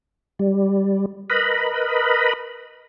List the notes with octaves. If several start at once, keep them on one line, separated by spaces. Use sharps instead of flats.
G3
A#4 B4 D#5 B5